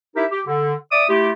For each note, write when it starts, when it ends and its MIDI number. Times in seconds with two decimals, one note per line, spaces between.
0.16 0.25 63
0.16 0.25 64
0.16 0.25 67
0.16 0.25 70
0.16 0.25 76
0.31 0.41 67
0.46 0.74 50
0.92 1.05 74
0.92 1.05 76
0.92 1.05 86
0.92 1.05 87
1.08 1.32 57
1.08 1.32 64
1.08 1.32 65
1.08 1.32 67